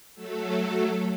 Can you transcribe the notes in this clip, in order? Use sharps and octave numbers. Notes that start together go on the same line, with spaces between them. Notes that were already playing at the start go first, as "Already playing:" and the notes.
F#3 A3 A4